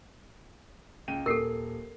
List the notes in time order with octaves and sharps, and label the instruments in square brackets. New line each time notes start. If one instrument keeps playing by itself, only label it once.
[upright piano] C#2 G5 D#7
[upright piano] D#1 C7 [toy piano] A4 A#4